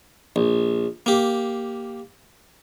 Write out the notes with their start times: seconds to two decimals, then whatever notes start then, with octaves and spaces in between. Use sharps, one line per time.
0.36 A#1
1.06 A#3 G4